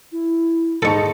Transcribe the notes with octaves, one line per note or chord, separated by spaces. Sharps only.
E4
G#2 D#4 A4 A5 C#6